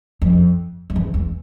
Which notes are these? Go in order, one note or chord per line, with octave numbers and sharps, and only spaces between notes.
F2
F2
E2
E2